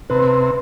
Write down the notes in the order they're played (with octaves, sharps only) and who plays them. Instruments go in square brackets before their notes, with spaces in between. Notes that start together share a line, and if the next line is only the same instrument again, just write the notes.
[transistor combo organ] C3 [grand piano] B4